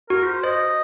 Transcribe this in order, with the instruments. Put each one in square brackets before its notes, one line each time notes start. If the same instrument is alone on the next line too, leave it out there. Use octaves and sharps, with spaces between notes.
[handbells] F#4 [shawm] A#4
[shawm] C5
[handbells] C5 [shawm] D#5